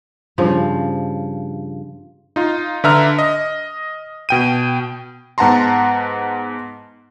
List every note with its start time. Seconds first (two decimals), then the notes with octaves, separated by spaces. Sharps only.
0.38 G2 C#3 F3
2.36 D#4 F4
2.84 D3 B4 E5 A#5 F6
3.19 D#5
4.29 B2 G5 D#7
5.38 G#2 B3 F#5 A5 A#5 C6